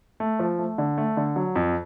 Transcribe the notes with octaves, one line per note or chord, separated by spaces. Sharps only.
A3
F3
A3
D3
A3
D3
F#3
F2